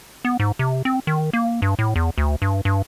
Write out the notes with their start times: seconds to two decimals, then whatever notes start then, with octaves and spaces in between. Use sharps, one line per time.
0.25 B3
0.40 G#2
0.59 C3
0.85 C4
1.07 D#3
1.33 A#3
1.62 G2
1.79 A2
1.96 E2
2.18 D2
2.42 G2
2.65 G2